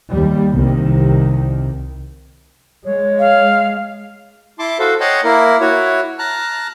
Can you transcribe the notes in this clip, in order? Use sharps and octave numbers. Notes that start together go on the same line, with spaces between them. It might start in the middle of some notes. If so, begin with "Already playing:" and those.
D#2 G3
C2 C3 D#3
G#3 C#5
F5
E4 A5 C6 D6
F#4 A4 C5 F5
C#5 D#5 F#5 G5 A5 C6
A#3 E4 A#4
E4 F#4 C#5
A5 A#5 F6 F#6